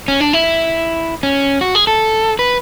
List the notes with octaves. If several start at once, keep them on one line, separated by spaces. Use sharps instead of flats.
C#4
D4
E4
C#4
F#4
G#4
A4
B4